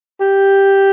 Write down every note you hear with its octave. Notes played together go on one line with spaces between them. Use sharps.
G4